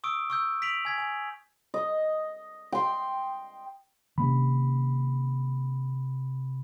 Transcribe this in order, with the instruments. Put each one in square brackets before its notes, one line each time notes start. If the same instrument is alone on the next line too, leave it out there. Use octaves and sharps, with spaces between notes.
[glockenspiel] C#6 D#6 E6 D7
C#6 E6 G6
C#6 B6 D7 F7 F#7
G#5 G#6 B6
G#5 G#6
[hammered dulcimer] D#5
G5 C6
[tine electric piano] C3 B5 [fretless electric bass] D#3 A#3 C#4